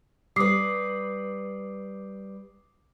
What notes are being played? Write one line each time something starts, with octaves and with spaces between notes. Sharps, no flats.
G3 B4 D6 D#6 C7